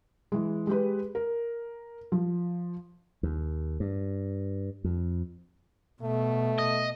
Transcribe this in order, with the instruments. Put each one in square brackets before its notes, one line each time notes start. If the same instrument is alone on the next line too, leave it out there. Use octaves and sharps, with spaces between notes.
[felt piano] E3 G#3
G#3 G4 B4
A#4
F3
[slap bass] D#2
G2
F2
[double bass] B2 [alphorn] A3
[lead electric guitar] D#5